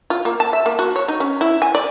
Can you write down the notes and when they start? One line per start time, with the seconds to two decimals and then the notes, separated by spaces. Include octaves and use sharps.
0.10 F4
0.25 A#3
0.40 A5
0.53 E5
0.66 A#3
0.79 F#4
0.96 C#5
1.08 D#4
1.20 C#4
1.41 E4
1.62 G#5
1.75 D5